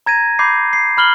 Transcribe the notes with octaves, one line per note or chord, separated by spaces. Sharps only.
A#5 G#6 A#6 D#7
B5 D6 G6 C7
C7
B5 F6 F#7 G7